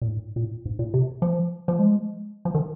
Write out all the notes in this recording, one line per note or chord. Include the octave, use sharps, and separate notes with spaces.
A#2
G#2
A#2
G#2
A#2
C3
F3
F3
G#3
F3
D#3